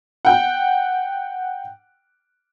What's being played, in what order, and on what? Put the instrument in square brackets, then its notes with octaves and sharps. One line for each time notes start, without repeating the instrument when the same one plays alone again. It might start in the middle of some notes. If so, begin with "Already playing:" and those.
[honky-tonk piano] F#5 G5